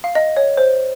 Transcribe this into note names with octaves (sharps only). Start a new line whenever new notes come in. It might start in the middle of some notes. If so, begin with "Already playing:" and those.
F5
D#5
C#5
C5